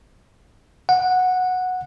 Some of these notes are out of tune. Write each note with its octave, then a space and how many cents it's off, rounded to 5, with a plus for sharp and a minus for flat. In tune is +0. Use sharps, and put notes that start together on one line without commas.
F#5 -10